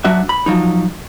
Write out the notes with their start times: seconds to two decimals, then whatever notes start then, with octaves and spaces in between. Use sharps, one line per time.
0.04 F#3 D4 F#4 E5
0.29 B5
0.46 F3 F#3 D#4